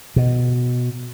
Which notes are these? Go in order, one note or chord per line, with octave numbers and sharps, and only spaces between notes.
B2